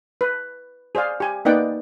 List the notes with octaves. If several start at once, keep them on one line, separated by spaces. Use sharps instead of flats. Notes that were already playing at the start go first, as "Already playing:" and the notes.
B4
G#4 C5 D5 F5
G4 G#5
A#3 B3 D#4 D5 F#5 G5